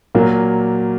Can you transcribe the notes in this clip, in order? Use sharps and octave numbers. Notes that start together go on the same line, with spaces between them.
A#2 F#3 A#3